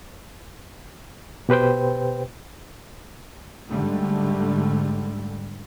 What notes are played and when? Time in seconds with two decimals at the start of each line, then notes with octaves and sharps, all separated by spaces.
1.49 B2 G4 B4 C5 G5
3.70 G#2 D3 G3 A3